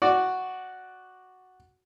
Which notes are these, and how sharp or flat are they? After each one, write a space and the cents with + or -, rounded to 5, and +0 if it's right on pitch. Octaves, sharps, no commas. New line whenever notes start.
F#4 +0 D5 +0